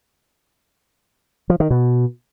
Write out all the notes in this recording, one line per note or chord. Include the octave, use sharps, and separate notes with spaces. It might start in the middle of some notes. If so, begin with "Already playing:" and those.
F3
D#3
B2